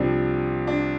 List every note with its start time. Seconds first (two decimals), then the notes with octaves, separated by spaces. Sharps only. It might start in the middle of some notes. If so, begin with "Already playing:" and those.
Already playing: C2 C3 F3 D4
0.67 D4